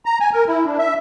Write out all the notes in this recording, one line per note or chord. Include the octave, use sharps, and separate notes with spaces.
A#5
G#5
A#4
E4
D4
E5